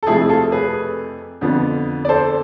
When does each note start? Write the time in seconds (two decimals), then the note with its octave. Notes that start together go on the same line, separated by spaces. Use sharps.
0.03 A4
0.07 F2 C3 F3 A3 E4 G#4
0.22 G#4
0.30 F4 A4
0.52 G#4 B4
1.41 F2 D3 F3 B3
2.05 D5
2.09 A4 C5